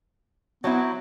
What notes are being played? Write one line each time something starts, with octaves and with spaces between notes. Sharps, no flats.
F#3 B3 C4 E4